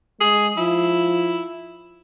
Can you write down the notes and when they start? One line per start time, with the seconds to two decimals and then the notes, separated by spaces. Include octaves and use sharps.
0.20 G#3 G#4
0.57 F3 E4